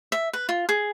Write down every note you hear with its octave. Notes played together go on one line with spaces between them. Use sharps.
E5
B4
F4
G#4